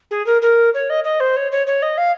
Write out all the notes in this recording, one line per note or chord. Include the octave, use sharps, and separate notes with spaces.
G#4
A#4
A#4
C#5
D#5
D#5
C5
C#5
C#5
C#5
D#5
F5